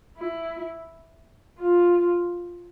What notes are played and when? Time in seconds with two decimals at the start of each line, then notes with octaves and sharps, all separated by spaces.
0.17 E4
1.59 F4